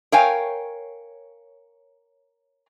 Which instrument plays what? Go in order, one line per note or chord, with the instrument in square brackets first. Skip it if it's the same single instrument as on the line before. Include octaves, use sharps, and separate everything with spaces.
[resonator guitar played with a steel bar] A#4 C#5 F5 G5 G#5